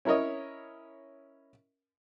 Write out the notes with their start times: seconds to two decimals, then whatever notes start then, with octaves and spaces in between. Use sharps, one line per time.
0.05 C#4 E4 A#4 C#5 D#5